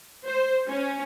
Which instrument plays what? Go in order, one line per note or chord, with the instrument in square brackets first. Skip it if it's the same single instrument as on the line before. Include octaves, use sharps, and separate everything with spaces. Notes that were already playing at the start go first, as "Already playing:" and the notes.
[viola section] C5
C#4